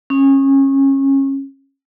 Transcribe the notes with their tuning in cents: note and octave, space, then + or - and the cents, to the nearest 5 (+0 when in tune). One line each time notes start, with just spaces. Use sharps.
C#4 -25